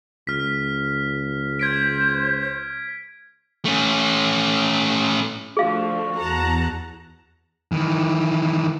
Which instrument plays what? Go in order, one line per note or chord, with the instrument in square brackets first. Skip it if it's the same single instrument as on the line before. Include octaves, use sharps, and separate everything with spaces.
[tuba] C#2 [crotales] F6 B6
[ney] C5 [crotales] G#6 B6 D7
[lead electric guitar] A3 C#4
[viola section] D3 F3 A3 [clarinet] F#4 [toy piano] G#4 F5
[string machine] E2 [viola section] F#5 A5 A#5
[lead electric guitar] D#3 E3